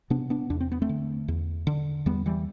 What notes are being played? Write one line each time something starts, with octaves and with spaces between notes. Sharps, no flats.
C3 B3 D4
B3 D4
E2 D4
C4
B3
A3 C4
D3
E2
D3
E2 G3 B3
E3 G3